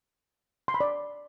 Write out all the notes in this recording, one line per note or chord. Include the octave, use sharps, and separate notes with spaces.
C6
B5
D5